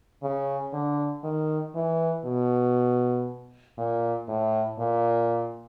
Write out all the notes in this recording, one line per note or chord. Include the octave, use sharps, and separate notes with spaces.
C#3
D3
D#3
E3
B2
A#2
A2
A#2